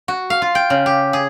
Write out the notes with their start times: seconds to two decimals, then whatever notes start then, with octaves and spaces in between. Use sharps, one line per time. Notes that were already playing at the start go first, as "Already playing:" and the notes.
0.08 F#4
0.30 F5
0.42 F4
0.55 G5
0.70 C#3
0.86 G4
1.13 G#4